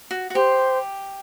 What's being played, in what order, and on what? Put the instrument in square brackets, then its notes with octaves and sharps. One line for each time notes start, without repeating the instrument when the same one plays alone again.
[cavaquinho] F#4
F#4
[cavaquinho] G4 [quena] C5